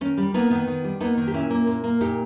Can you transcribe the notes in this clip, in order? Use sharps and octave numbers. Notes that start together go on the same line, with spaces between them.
D#3 C#4
G3
A#3 B3 D#4
D#3 B3 D#4
D#3
G3
A#3 B3 D#4
D#3
G4
A#2 C#4 E4
A#3
A#2
A#3
A#2 D#4 G4